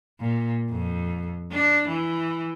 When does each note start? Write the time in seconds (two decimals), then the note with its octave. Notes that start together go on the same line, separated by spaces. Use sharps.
0.20 A#2
0.70 F2
1.52 D4
1.88 E3